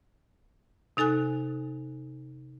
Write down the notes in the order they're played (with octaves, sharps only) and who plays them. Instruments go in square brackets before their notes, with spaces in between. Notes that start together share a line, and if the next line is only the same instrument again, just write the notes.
[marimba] C3 D#4 A4 G#5 F#6